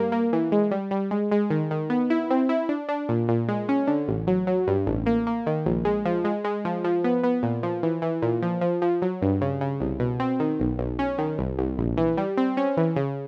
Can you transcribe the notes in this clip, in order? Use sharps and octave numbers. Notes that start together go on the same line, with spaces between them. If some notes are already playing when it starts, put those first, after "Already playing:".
Already playing: G2 A#3
A#3
E3
G#3
G3
G3
G#3
G#3
D#3
D#3
B3
E4
C4
E4
D4
D4
A#2
A#2
G#3
C#4
D3
A1
F#3
F#3
G2
A1
A#3
A#3
D#3
A#1
G#3
F3
G#3
G#3
F3
F3
B3
B3
A#2
F3
E3
E3
A#2
F3
F3
F3
F#3
G2
C#3
C#3
C2
B2
C4
D#3
B1
B1
C#4
D#3
C2
C2
A#1
E3
G3
C4
C#4
E3
C#3